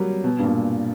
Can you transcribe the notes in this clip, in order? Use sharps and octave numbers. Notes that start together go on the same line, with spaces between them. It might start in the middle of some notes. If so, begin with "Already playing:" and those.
Already playing: F#3 G3 A#3
B2
G2
A#2